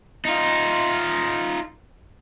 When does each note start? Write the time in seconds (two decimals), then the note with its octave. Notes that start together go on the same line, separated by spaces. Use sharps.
0.25 D#4 F4